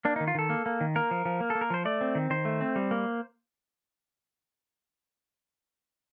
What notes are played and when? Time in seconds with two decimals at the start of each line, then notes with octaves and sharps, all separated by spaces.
0.05 A#3 D4
0.16 D#4
0.20 D#3
0.28 F4
0.35 D#3 A4
0.50 A#3
0.66 A#3
0.81 D#3
0.96 A#3 A#4
1.11 F3
1.25 F3
1.40 A#3
1.50 A4
1.55 A#3
1.61 A#4
1.70 F3 C5
1.85 A3 D5
2.01 C4
2.15 D#3
2.30 D#3 C5
2.45 A3
2.61 C4
2.76 G3
2.91 A#3